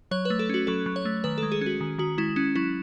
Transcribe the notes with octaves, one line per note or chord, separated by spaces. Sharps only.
F#3 C#5
B4
A3
A4
C#4 F#4
F#3 A4
F#3
C#5
A3
D#3 B4
A4
G#3
G#4
C#4 F#4
D#3
D#3 F#4
G#3 E4
C#4 E4
F#3 E4